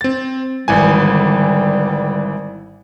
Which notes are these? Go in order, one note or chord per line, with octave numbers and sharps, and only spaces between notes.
C4 A6
G#1 D3 E3 G3 G#5